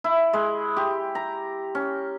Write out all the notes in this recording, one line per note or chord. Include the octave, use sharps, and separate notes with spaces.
E4
G#3
G4
A#5
C#4